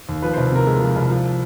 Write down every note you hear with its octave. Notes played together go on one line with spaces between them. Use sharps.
D#2
F3 B4
C2 C5
C3 A#4
G#3 A4
F3
C2
F3